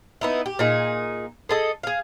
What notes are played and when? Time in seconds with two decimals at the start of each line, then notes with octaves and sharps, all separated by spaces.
0.21 B3 D#4 E4
0.46 G4
0.59 A#2 D#4 G#4
1.49 G#4 A4 D#5
1.83 G#4 F5